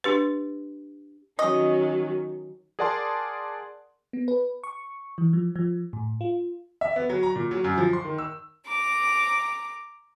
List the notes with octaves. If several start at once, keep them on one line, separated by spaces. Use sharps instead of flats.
D4 G4 B4
D#3 F#3 C#4 D#5
G#4 A#4 D5 F#5 A5 C6
B3
B4
C#6
E3
F3
F3
A2
F4
E5
B3
F#3
A#5
A#2
F#3
F#2
F3
C6
D#3
E6
A#5 D6